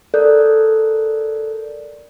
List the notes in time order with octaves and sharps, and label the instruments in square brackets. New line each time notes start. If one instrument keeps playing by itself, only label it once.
[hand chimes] A4 A#4 D5 F#6 G6